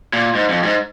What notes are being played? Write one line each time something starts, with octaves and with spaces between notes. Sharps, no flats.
A#2
G#2
F2
G#2